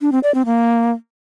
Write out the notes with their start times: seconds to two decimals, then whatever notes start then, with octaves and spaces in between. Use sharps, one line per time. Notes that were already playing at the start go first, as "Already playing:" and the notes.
0.01 D4
0.12 C4
0.23 D5
0.35 C4
0.46 A#3